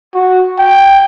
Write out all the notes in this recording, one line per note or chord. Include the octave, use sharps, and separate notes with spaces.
F#4
G5